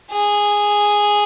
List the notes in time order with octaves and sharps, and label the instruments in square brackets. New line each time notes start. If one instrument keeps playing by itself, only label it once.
[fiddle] G#4